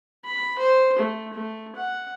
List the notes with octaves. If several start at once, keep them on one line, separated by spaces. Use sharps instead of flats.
B5
C5
A3
A3
F#5